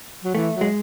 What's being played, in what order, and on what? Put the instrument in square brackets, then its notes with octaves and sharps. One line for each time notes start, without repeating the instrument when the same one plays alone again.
[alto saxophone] F#3
[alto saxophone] E3 [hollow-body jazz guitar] A3
[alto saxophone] F#3
[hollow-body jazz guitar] G#3